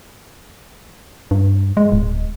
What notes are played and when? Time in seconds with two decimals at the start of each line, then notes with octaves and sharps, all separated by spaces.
1.31 G2
1.77 G#3
1.92 D1